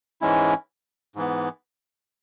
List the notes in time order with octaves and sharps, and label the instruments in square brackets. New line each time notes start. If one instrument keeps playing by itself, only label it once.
[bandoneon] G#2 E3 G#3 C#4 E4
G#2 E3 B3